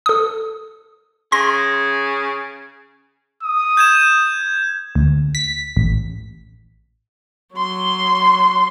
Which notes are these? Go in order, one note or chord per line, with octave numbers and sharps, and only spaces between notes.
A4 D#6
C#3 C6 A#6
D#6
G6 G#6 E7
D2
B6
A1
F#3 C6